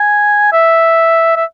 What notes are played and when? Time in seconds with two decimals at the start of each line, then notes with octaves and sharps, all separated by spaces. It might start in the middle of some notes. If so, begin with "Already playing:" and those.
Already playing: G#5
0.53 E5
1.36 E5